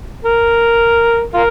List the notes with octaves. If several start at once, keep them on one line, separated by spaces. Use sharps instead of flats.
A#4
F4 A#4